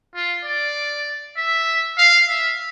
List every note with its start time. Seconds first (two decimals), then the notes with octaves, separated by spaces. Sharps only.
0.15 F4
0.45 D5
1.37 E5
1.98 F5
2.28 E5